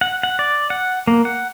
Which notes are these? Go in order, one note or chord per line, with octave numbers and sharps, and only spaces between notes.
F#5
F#5
D5
F#5
A#3
F#5